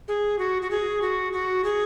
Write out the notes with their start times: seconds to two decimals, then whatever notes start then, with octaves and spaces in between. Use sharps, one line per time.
0.08 G#4
0.39 F#4
0.62 F#4
0.71 G#4
1.02 F#4
1.33 F#4
1.64 G#4